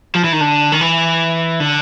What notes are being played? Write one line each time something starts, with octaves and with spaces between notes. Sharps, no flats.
F3
E3
D#3
D3
D#3
E3
D3